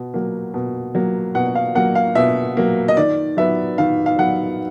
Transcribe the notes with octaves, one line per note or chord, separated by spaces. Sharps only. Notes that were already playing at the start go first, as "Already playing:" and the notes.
Already playing: B2
F#3 A#3
B2
F#3 A#3
B2 F#5
F5
F#3 A#3 F#5
F5
B2 E5
F#3 A#3
D#5
D#3 D5
F#3 B3 E5
D#3 F5
F5
F#3 B3 F#5